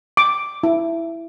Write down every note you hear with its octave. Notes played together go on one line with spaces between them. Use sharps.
D6
E4